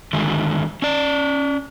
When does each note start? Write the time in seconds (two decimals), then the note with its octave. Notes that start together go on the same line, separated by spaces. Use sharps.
0.13 D3 D#3 G#3 F#4
0.82 C#4 D5